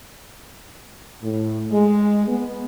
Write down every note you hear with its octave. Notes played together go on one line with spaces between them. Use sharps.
A2
G#3
B3